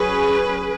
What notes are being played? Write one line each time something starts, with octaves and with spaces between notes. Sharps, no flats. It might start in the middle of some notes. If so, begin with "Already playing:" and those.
Already playing: F#3 C#4 G#4 B4